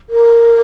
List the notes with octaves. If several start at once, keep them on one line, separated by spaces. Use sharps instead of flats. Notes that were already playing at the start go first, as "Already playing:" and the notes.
A#4